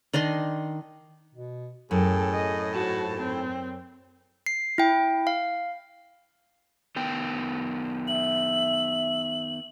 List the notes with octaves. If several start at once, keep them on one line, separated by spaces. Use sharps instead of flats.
D#3 D4 D#5 C6
B2
F#2 A2 G#4 A4 G5
D#5
G#2 F#4 A5
C4
C7
E4 G5
F5
D#3 B3 G5
E5 F#7